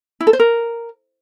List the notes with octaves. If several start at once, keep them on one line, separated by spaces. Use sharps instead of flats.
E4
A4
C5
A#4